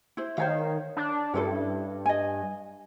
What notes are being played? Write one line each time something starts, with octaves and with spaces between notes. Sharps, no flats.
E4 C5
D#3 C5 C#5 F5
D4
G2 C#4 E4 A4
D#5 G#5